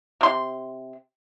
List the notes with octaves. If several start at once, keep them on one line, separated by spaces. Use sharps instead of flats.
C3 C6